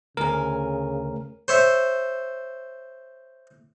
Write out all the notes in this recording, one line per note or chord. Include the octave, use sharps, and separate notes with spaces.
D2 C#3 A#4 G#5
C5 C#5 E5